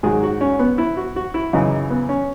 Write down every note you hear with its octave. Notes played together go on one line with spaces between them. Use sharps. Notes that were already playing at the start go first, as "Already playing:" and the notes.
G#2 D#3 F#3 G#4
F#4
C#4
B3
E4
F#4
F#4
E4
F#2 C#3 E3 D#4
B3
C#4